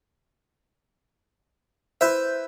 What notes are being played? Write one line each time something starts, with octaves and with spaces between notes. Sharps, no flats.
E4 B4 C5 E5 G6